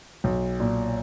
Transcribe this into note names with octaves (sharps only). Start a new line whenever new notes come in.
B1
A#2